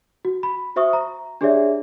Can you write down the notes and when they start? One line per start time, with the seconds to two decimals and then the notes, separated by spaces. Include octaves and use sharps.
0.25 F#4
0.43 B5
0.76 F#4 C5 E5 C#6 D#6
0.93 A#5
1.41 D4 G4 G#4 C#5 D5 E5